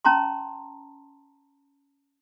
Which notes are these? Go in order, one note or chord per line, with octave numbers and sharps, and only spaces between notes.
C#4 A5 A#5 C6